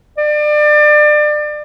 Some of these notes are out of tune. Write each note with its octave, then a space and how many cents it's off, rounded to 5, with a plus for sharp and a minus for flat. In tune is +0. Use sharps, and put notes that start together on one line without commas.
D5 +30